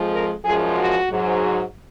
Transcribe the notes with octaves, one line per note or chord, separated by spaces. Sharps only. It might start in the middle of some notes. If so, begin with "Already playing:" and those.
Already playing: F2 F3 G#3
A#4
F#2 F3 G#3 G#4
F#4
G#2 F#3